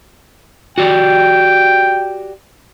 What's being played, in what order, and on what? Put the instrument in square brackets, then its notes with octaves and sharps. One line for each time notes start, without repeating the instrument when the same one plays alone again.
[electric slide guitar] F#4 G4 D5 [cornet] G5